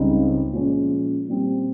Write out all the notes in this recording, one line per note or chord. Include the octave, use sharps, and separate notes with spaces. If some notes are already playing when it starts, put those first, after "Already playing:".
Already playing: C#2 C#3 G3 C4 D#4
A#2 F3 G#3 C#4
A#2 G3 C4 G4